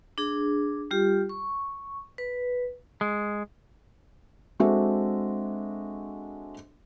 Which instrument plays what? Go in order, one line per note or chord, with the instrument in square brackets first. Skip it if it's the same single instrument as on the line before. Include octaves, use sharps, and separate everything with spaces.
[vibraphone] D4 G#4
G3 F4 G4
C#6
B4
[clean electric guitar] G#3
[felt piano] G#3 C4 D4 F#4 A4 E5